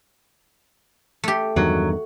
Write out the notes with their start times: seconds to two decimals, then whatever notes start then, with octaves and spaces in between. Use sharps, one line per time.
1.24 A3 G4
1.56 E2 G2 D#3 F#3